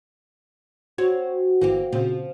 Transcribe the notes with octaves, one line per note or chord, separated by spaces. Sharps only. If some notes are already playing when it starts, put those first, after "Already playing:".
C4 F#4 C#5
G1 E3 A#3 C4 G4
A#2 C#3 F3 C4